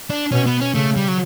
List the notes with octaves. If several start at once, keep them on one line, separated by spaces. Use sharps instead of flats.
D4
B2 C#4
B3
C#4
C#3 A3
G3
F#3